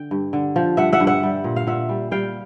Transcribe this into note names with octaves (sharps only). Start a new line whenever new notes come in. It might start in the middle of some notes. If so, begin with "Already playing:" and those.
Already playing: D3 G5
G2
D3
F3
G2 E5 F#5
E5 F#5
G2
E5 F#5
G3
A#2
F5
A#2 E5 F#5
G3
G3 F5 G5